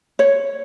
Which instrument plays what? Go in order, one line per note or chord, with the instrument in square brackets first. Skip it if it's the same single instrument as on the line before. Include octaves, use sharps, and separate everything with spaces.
[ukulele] C#5